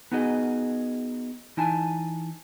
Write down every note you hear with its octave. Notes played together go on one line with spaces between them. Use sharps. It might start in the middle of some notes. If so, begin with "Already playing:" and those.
B3 D#4 F#4 G#4 D#5
E3 D#4 E4 G#5 A5